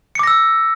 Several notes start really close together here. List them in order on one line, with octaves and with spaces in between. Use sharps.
C#7 D6 A#6 E6